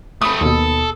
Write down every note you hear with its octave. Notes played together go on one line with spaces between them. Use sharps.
A3 C4 B5 D#6
D#2 B2 A4